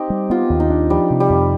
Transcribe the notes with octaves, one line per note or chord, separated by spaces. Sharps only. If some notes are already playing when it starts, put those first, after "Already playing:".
Already playing: C4 D#4 G4
G3
B3 F4
D#2
D#4
D4
F3 G3
C3
G3
F2